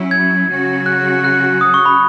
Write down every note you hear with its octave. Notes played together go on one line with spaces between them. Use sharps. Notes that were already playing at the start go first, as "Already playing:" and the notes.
Already playing: F#3 C#4 E4
G#6
C#3 F#3 C#4 F#4
F#6
F#6
D#6
C#6
B5